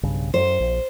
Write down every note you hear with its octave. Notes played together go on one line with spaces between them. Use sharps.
B1 G2 C#3
F#2 C5
A#1